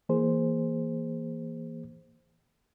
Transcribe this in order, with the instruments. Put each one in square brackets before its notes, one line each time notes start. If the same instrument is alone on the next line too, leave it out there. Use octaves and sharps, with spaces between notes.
[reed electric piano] E3 A#3 G#4 C5